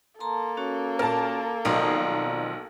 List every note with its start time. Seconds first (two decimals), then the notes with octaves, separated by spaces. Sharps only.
0.20 A#3 A4 A5 A#5 C6
0.57 C#4 F#4 C#5
0.99 A#2 A#4 A5
1.65 B1 D#3 F3 C4 D5 F5 A#5